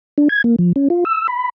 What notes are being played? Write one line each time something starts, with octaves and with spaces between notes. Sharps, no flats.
D4
G#6
A#3
F3
C#4
F4
E6
B5